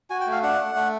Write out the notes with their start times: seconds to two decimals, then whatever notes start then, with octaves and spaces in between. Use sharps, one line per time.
0.10 F#4 G#5
0.21 G5
0.27 A3 F5
0.43 D4 F#5
0.59 A3
0.75 A3